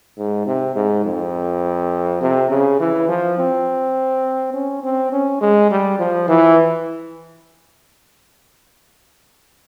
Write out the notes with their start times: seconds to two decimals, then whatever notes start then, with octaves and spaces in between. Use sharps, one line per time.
0.18 G#2
0.47 C3
0.75 G#2
1.05 F2
2.22 C3
2.50 C#3
2.80 E3
3.09 F3
3.38 C4
4.54 C#4
4.83 C4
5.12 C#4
5.41 G#3
5.70 G3
5.99 F3
6.28 E3